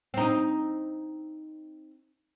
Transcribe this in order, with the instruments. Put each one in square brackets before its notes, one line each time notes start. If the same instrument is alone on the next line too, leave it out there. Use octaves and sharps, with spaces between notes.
[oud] C4 D#4